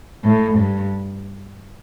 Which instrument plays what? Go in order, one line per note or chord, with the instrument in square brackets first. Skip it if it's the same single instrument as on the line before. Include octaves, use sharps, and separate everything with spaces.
[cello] A2
G2